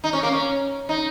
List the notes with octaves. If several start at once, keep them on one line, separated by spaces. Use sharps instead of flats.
D#4
C#4
A#3
C#4
D#4